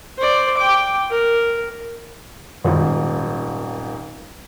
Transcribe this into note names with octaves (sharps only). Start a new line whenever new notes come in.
C5 D5
G5 D6
A#4
D#1 G#1 F#2